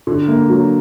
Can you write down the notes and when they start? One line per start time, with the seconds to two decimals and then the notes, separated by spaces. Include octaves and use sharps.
0.07 D3
0.28 A#3
0.49 F#3